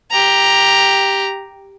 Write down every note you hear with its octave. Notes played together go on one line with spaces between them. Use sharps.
G4 A#5